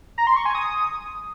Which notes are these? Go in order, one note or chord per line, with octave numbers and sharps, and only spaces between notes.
A#5
C6
C#6
G#5
D#6